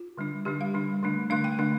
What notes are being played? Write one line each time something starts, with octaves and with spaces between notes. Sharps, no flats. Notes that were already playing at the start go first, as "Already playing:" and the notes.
Already playing: F4
D3 G3 D4
D3 G3 D4 G4
F5
D3 G3 D4
D3 A3 D4
D3 A3 D4 F5
G5
D3 A3 D4